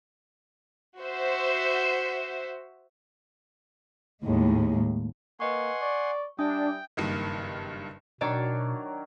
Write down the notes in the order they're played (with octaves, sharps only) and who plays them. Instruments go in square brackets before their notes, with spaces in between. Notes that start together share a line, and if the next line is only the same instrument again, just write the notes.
[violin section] F#4 C5 E5
[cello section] D#2 A2 G#3
[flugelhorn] A#3 [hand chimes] B4 D#5 C#6 [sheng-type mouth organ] F#5 G#5 C6
[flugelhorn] D5 [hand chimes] C#6
[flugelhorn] G3 [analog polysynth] D4 [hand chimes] E5 G#5 D#6 [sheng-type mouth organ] G5
[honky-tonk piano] F#1 G2 D#3
[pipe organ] B2 [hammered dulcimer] D#3 F#3 A#4 [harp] D4 C#5 D5